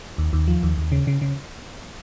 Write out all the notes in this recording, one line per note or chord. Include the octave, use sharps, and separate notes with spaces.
D#2
D#2
F3
D#2
D#2
C#3
C#3
C#3